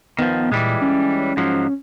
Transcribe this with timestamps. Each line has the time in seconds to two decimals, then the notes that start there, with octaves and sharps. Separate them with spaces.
0.19 D#3 F3 B3
0.52 A#2 E3 G3 G#3
0.82 C#4
1.37 G#2 F3 F#3